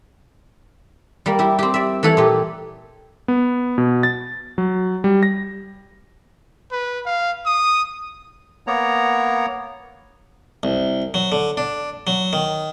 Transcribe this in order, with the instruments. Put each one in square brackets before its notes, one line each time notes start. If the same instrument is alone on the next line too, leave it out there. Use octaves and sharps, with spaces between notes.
[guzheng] G3 A#3
E4 G4
C4 G4
D5 E5
E3 A3 A4 C#5 F#5
A#2 G4
[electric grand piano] B3
B2
A6
F#3
G3
A#6
[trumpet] B4
F5
D#6
[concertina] A#3 B3 C#5 A#5
[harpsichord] C2
F#3
D3
D4
F#3
D#3